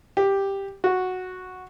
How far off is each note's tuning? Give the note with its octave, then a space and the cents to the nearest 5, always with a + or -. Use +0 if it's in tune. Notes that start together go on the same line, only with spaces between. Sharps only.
G4 +5
F#4 -5